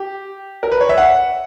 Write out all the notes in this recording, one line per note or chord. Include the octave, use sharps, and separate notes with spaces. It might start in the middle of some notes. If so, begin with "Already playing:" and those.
Already playing: G4
A#4
B4
C#5
E5
F#5